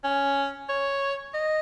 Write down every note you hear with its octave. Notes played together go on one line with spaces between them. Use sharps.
C#4
C#5
D#5